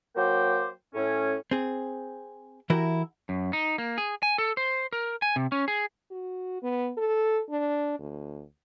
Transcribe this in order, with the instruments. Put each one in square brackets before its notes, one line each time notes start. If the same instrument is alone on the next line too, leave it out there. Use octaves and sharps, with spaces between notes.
[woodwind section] F#3 A#3 C5 G5 D6
A2 C#4
[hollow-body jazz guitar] C4 G#4
E3 E4 F#4 G4 A#4
[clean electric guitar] F#2
D#4
A#3
G#4
G#5
A4
C5
A#4
G#5
C3
C#4
G#4
[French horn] F#4
B3
A4
D4
D2